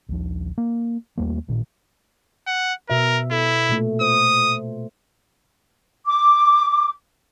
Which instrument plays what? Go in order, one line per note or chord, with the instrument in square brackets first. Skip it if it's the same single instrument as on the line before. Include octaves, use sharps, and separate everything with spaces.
[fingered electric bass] A#1 D#2 F3
A#3
D#2 G3 A3 A#3
A1 A#2 D#3
[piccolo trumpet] F#5
[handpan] B2 E5 [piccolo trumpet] A#4
[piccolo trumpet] E4 [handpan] A4
[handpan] A#2 A3
[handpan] C5 [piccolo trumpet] D#6
[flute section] D6